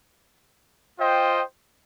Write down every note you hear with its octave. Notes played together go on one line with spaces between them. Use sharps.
F4 C5 D#5 G5